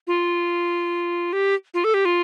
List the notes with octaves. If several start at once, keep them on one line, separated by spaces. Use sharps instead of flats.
F4
G4
F4
A4
G4
F4